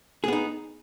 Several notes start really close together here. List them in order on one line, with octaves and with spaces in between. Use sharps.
G#4 B3 D#4